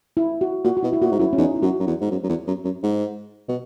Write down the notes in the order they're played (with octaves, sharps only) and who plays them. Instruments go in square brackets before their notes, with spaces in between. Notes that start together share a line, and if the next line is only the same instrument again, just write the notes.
[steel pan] E4
F#4
[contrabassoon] A#2 [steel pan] F#4
[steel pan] F#4
[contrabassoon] B2 [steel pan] E4
[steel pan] E4
[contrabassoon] A#2 [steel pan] F#4
[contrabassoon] G#2
[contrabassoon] F#2 [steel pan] E4
[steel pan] C#4
[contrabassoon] E2 [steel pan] D#4
[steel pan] E4
[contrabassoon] F#2 [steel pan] F#4
[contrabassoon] F#2
E2
G#2
F#2
F#2
E2
F#2
F#2
G#2
B2